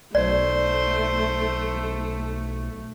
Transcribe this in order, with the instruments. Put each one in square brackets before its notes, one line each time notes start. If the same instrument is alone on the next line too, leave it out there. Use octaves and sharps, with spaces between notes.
[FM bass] B1 [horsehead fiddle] A3 [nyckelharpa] C5 [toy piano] D5